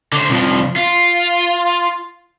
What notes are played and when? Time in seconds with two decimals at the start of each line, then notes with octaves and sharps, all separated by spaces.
0.13 D3 C5
0.30 C2 F3
0.76 F4